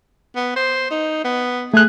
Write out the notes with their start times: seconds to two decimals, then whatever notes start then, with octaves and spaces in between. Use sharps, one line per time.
0.36 B3
0.56 C5
0.91 D#4
1.24 B3
1.74 A3 G#4 F#6